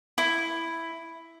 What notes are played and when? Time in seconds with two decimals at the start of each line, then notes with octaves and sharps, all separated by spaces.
0.18 E4